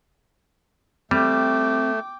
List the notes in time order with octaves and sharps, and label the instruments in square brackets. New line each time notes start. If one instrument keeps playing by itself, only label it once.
[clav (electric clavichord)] G3 [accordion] A3 [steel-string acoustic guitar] C4 [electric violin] G5 D6